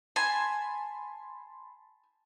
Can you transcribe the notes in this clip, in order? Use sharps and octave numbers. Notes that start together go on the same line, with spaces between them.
G#5 A5 B5 C6